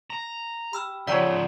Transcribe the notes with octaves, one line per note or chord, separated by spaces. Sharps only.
A#5
G4 B5 E6 F6
C#3 F3 C#5 D5 E5 F#5 A#5